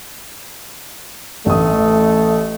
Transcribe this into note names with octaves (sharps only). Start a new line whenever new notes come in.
A1 A3 D#6